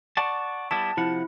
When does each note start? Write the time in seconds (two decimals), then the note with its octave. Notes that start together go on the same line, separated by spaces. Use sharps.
0.17 D5 F#5 A5 C#6
0.71 G3 B3 E4 A5
0.97 C3 F3 E4 F#5